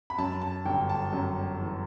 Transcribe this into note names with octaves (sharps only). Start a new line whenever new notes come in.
B5
F#2 A5
A5
G1 G5
A5
F#2
E3